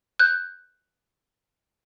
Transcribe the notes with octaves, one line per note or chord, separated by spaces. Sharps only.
F#6 G6